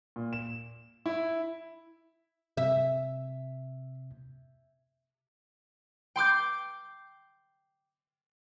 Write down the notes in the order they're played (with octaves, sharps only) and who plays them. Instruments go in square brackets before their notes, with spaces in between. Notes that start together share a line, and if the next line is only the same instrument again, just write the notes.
[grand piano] A#2
E7
E4
[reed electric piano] C3 [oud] E5
[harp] G5 C6 D6 G6